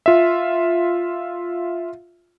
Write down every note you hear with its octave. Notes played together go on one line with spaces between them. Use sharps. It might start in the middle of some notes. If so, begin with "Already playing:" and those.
F4 E5